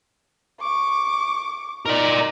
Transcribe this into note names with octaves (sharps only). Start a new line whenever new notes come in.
C#6 D6
D#4 A#4 D5